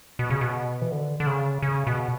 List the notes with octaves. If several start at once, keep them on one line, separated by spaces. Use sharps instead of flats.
B2
C#3
B2
E3
D3
D3
C#3
C#3
B2